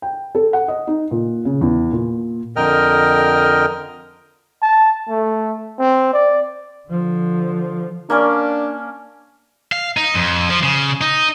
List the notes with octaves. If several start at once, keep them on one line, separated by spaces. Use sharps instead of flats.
G5
A4
F#5
D#5
D#4
A#2
C#3
E2
A#2
F2 D3 A#4 D#5 G5 F6
A5
A3
C4
D5
D3 F3
A#3 C#4 D4 D5
F5
D#4
F2
F3
C#3
D#4